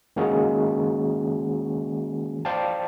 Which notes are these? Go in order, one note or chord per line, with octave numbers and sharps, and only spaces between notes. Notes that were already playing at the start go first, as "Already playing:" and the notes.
D#3 G#3 A#3 C#4 F#4 G#4
C5 D5 F5 G5 A5